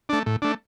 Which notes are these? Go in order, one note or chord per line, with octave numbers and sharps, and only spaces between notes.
A3 D4
A2
A3 D4